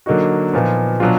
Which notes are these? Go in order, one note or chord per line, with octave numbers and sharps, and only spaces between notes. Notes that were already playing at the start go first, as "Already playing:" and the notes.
D3 F#3 A#3 D#4 F#4
A#2 F3 B3 D#4
B2 F#3 D4 F4